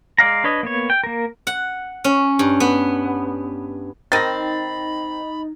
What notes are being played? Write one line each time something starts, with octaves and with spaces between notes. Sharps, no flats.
G#3 D5 F5 A#5
D4 B4 C#5 D#5
A#3 B3 C#5
G5
A#3 A#4
F#5
C#4
G2
B3
D#3 C4 D#4 B5 A6 A#6